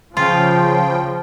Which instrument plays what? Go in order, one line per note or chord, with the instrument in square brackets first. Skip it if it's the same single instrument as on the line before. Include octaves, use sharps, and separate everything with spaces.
[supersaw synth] C#3 G5 [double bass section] F3 [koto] F4